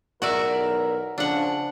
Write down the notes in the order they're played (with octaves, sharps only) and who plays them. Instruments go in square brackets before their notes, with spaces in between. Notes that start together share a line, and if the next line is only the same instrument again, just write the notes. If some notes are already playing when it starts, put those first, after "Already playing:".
[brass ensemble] B1 E2 A#4 [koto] F#4 D5 E5
[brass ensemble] C#3 F3 [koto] D4 F#5